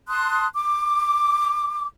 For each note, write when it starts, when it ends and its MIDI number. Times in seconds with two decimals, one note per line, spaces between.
0.08 0.46 81
0.08 0.46 84
0.08 0.46 87
0.08 0.46 90
0.53 1.86 86